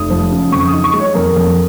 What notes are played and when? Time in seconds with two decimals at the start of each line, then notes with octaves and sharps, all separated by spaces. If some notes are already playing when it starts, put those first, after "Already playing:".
Already playing: F1 D#6
0.10 F3
0.32 C#3
0.52 F2 C#6
0.67 D#6
0.73 D#4
0.84 C#6
0.94 G#3
0.99 C#5
1.15 F2 A#4
1.36 F2